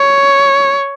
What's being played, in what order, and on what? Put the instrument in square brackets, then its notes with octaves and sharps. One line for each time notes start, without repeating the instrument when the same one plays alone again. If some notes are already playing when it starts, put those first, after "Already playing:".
Already playing: [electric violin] C#5